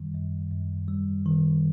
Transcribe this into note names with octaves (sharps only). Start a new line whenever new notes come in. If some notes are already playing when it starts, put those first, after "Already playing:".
Already playing: F#2 D#3 G3
F#2
F#2
G3
D#3